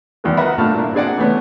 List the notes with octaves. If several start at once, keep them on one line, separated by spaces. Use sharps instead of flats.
E2 D#3 G#3 A#4
A#4 B4 D#5 E5 F#5 B5
G2 A#2 A3 A5 F6
A#3 D4 E4
C4 D4 G#4 D5 D#5 F#5
E3 A3 B3 C#4